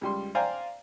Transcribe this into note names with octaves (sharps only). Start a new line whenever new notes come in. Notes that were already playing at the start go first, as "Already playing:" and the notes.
C#2 G3 C6
C5 D5 F5 G5 G#5 A#5